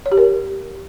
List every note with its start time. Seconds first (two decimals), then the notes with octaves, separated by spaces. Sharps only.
0.06 C#5
0.12 G4
0.17 A#4